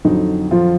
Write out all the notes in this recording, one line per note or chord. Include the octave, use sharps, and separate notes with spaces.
F2 D3 F#3 D#4
F3 F4